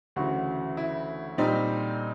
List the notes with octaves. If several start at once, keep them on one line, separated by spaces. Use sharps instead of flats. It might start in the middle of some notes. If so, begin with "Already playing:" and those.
D2 C#3 E3 F#4
E4
A#2 G3 C4 D#4